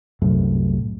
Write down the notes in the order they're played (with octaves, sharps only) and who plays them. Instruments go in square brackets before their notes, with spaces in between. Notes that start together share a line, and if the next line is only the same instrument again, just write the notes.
[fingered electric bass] C2 F#2 A2